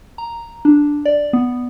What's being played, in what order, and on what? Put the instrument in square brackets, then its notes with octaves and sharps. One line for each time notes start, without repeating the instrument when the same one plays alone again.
[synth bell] A#5
D4
D5
B3